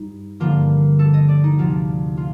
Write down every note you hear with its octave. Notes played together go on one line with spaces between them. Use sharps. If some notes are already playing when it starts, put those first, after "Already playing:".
Already playing: G2 D#4
G2 D3 F3 A#3 F4
A4
D#5
D5
D#4
D2 C3 F3 F4
F4